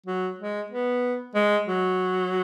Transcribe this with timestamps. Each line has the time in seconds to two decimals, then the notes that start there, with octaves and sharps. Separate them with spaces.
0.06 F#3
0.39 G#3
0.71 B3
1.35 G#3
1.67 F#3